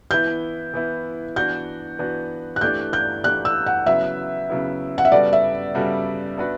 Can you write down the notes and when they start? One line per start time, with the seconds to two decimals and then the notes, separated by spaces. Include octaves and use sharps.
0.11 E3 B3 E4 G6
0.74 E3 B3 E4
1.36 E3 B3 D4 F#4 G6
1.99 E3 B3 D4 F#4
2.56 F#6
2.61 E3 A3 D4 G4 D5 G6
2.93 G6
3.24 E3 A3 D4 G4 D5 F#6
3.45 E6
3.66 F#5
3.86 C#3 F#3 B3 E4 E5
4.49 C#3 F#3 B3 E4
4.98 F#5
5.05 E5
5.12 C#3 G3 B3 F#4 A4 D5
5.33 E5
5.75 C#3 G3 B3 F#4 A4
6.37 B3 D4 F#4 B4